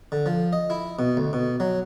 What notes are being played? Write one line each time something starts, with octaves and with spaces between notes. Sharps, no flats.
D3
F3
D#5
E4
B2
D2
B2
F#3